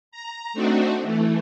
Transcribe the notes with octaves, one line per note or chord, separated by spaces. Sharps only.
A#5
A3 C4 D4 D#4 F#4
E3 A3